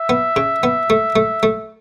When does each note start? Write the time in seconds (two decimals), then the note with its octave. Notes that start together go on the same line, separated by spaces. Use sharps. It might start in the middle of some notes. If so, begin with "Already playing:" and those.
Already playing: E5
0.09 B3
0.36 C#3
0.63 B3
0.90 A3
1.16 A3
1.43 A3